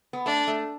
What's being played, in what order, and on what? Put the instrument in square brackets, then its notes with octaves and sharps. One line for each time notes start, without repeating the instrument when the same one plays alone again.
[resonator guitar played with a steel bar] B3
[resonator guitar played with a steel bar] A3 [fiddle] D4
[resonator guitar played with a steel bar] A3